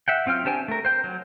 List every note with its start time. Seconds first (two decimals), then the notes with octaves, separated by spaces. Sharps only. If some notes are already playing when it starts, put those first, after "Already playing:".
0.08 E5 F#5 G5
0.26 F#3 C4 F4 G5 F6
0.45 D4 G4 C5 G5 G#5
0.68 A3 A#4
0.85 C5 G5
1.04 F#3